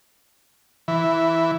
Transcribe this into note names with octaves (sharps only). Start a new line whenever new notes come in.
E3